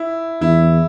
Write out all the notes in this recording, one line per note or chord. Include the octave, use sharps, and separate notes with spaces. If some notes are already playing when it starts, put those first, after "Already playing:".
Already playing: E4
E2 E4